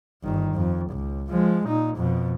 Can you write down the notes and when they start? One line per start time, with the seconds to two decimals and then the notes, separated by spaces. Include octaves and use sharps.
0.24 G1 D#3
0.55 F2
0.90 C#2
1.30 F3 G#3
1.68 A#2 D#4
1.97 F2 B2